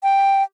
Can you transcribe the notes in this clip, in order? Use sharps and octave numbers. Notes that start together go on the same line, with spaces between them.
G5